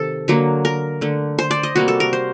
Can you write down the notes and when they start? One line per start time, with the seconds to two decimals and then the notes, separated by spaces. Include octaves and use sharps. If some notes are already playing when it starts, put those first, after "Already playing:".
Already playing: C3 D#3 A4
0.28 D3 F#3 A#3
0.65 A#4
1.01 D3 A3
1.39 C5
1.51 D5
1.63 D#5
1.75 C3 G3 A#3 F#4
1.88 A4
2.00 A#4
2.13 C5